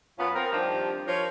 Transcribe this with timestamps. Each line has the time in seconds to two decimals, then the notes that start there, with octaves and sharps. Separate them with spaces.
0.19 F#2 B3 C#4 F4
0.35 C4 A#4
0.52 G2 D#3 F3 C4 G4
1.08 F3 A#4 C#5